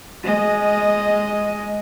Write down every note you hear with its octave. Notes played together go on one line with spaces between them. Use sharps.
G#3 D#5